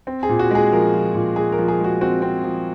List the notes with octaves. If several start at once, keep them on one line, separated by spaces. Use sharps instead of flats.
C4
G#4
A#2
F#4
G#3 G#4
F3 A#4
F3
A#2
G#3 G#4
A#4
F3
G#4
G#3 F#4
C4 F#4
C4
F3